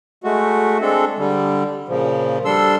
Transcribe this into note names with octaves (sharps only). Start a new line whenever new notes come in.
G#3 A3 F#4
G#3 C4 D4 A4
D3 G3
A#2 C#3 F3
G3 D4 A4 C6 E6